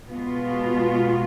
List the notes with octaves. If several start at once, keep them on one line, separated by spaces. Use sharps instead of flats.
B2 G#3 B3 F4